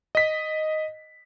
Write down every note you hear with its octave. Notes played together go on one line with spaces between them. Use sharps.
D#5 B6